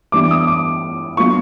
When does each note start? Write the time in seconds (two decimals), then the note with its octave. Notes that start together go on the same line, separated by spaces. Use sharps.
0.12 E3 G3 B3 D4 D6
0.31 D#6
0.47 D6
1.17 F#3 B3 D4 F4 C#6